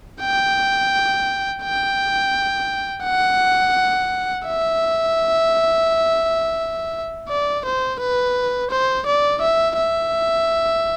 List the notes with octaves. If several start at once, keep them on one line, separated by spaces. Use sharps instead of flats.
G5
G5
F#5
E5
D5
C5
B4
C5
D5
E5
E5